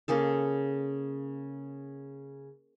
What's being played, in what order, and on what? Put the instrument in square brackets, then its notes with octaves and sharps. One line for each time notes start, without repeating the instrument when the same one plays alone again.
[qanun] C#3 A#3 G#4 A4